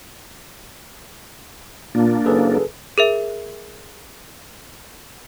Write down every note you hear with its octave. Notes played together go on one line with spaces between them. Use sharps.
A#2 A#3 D4
F#1 G#4 A4 B4
G#4 A#4 E5